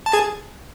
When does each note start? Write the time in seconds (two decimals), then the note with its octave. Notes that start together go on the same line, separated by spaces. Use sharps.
0.06 A5
0.13 G#4 G#5